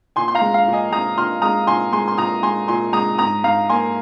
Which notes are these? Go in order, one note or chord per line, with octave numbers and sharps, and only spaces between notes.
A#2 G#5 C6
C6
F5 A#5
G#3
F5
A#2
D#5 G#5
G#3 A#5 D#6
A#2 C6 F6
G#3 A#5 D#6
A#2 G#5 C6
G#3 G#5 C6
C6
A#2 A#5 D#6
G#3 G#5 C6
A#2 G#5 C6
G#3 A#5 D#6
G#2 A#5 D#6
G#2 F5 A#5
A#3 G#5 C6